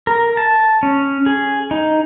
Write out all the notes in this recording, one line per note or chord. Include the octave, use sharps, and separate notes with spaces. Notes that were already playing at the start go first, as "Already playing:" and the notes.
A#4
A5
C#4
G#4
D#4